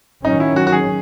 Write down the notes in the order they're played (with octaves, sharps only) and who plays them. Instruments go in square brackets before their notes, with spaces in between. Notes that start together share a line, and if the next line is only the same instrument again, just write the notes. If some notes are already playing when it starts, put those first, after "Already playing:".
[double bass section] D#3 F#3 C#4 [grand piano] D#4
[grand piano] E4
F#4
F#4
G#4